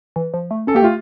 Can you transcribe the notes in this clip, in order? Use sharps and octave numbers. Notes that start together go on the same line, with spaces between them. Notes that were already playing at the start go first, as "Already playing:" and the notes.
E3
F3
A3
C#4 A4
A#3 G4
A3 F4